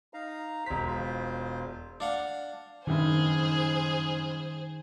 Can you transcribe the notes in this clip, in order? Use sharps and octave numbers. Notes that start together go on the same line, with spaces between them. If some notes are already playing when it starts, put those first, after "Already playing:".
D#4 F5 A#5
E1 C5 B6
F4 C5
D4 F5 F#5
F#1 G2 D#3 G3 G#4 C5